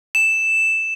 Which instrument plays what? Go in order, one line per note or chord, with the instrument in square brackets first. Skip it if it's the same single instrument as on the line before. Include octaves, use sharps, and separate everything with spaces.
[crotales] E7